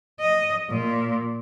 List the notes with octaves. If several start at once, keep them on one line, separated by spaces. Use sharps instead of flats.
D#5
A#2